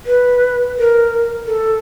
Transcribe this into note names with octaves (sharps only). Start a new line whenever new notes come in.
B4
A#4
A4